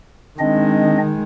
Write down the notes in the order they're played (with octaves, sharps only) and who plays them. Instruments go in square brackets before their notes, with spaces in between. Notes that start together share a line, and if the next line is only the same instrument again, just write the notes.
[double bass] D#3 G#3 [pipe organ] C4 D4 D#5